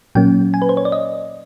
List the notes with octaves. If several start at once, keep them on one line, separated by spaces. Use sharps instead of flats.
A#2 F#3 A#3 C#4 G5
G#5
B4
C5
C#5
D5
D#5